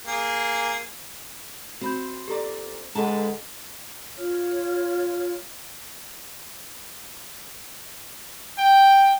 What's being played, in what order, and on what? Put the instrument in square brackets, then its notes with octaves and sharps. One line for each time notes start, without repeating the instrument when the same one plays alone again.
[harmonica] A#3 G#4
[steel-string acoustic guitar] C4 [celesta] F#4 B5 G6
[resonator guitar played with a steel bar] A#2 D5 [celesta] G4 A4 A#5
[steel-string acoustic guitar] D3 A4 B4 [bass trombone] G#3 [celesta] G#4 F#5 A#5 [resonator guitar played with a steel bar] A5
[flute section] F4 C#5 F6
[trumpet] G5